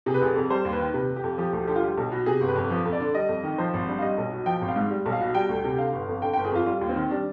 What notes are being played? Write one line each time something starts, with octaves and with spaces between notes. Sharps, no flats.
C3 G#4
B4
F1 G#4
F2
G3 C5
D#2
B4
D#3
C3 B4
F1
G4
F2
F3 G4
D2 G4
D3 G4
F4
G3 G4
B1
B2
C3 G#4
G1
B4
F2
F3
F2
D5
D3
G3 D#5
F2
D#3
F3 C5
G#1
G2
F5
G3 D#5
B1
B2
F3 G5
G#1
F5
G#2
G3
B1
F5
B2
G3 G5
D2
C3
D3 F5
G1
F2
D3 G5
G1 G5
G#4
F2 F4
G3 F4
D#2
C4
D#3
G3 D4